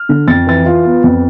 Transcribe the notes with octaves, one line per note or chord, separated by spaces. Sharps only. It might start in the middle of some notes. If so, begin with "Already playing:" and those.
Already playing: F6
D3
F2 A6
E3 A6
F4
B3
F2